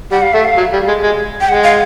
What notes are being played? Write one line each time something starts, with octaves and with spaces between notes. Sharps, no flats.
G3 F#5
F5
A3 E5
F5
F#3
G3
G#3
G#3
G5
G#3 F#5
F5